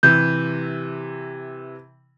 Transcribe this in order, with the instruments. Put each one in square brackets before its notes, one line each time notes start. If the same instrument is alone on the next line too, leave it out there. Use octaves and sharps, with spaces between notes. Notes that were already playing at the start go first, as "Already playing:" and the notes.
[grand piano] C3 E3 [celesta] G6